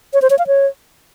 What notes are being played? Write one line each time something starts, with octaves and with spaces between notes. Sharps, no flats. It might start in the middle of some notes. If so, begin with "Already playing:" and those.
C#5
C5
C#5
F5
C#5